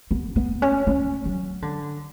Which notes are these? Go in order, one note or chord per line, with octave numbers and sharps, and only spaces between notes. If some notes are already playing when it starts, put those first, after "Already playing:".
B3
B3
C#4
C#4
F#3
D3